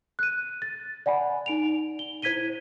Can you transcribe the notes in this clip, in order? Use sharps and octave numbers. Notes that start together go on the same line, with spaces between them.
F#6 D#7
A6
D5 F#5 G#5 B5
D#4 D7 F7
G7
E4 C5 G#6 B6 D#7 G7